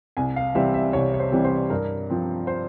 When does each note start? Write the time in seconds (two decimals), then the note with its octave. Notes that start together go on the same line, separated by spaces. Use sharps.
0.17 C2 G#5
0.36 F5
0.55 C3 E3 G3 C4 E5
0.74 E5
0.93 C2 C#5
1.14 C#5
1.20 C5
1.32 C3 E3 G3 C4
1.44 C5
1.70 G2 A#4
2.10 F3 C4
2.47 C5